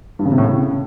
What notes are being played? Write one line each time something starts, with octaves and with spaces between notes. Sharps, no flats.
G2
C#3
C3
A2
C#3